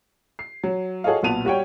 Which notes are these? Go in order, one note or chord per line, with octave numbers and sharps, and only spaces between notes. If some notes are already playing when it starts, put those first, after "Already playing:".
C7
F#3
F#4 G#4 A4 C#5 D#5 F5
B1 A#2 B3 A5 D#7 F7
G3 F#4 C#5 G5